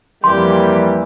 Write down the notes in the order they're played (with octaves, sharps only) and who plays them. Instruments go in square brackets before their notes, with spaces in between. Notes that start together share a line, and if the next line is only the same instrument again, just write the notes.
[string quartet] F2 G4 [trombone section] E3 G3 A#3 [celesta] C6